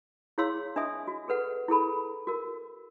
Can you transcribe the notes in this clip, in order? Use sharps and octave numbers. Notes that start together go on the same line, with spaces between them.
E4 G#4 C#5 F5 C6 E6
D4 D#5 E5 G#5 D#6
F#4
G#4 A4 B4 F#5
E4 G#4 A4 B5
F#4 A#4